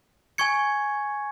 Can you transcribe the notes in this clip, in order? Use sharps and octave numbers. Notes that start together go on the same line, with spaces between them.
G#5 C#6 G#6 C#7